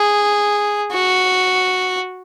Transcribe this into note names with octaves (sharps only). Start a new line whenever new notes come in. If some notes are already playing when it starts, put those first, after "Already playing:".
Already playing: G#4
F#4